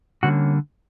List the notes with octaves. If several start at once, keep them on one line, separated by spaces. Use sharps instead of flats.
D3 G3 A#3 C#4 F#4